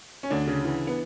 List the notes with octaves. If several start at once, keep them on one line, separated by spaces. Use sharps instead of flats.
C#4
D2 D4
C#3
E3
B3